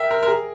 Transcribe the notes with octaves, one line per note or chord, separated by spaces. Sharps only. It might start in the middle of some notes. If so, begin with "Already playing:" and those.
Already playing: A#4 E5 G5
A#4
A#4
G#4